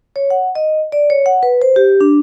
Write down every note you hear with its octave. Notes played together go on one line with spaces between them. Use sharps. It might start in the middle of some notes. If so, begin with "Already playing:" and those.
C#5
F#5
D#5
D5
C#5
F#5
B4
C5
G4
D4